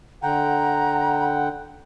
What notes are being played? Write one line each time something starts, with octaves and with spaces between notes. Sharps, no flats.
D3 F#5 G5 A#5